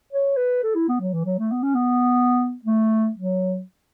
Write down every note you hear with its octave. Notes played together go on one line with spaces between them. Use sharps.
C#5
B4
A4
E4
B3
F#3
E3
F#3
A3
B3
C#4
B3
A3
F#3